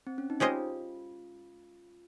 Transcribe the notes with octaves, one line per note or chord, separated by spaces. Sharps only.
C4
C#4
D#4
G#3 C#4 F4 G4 C5 D#5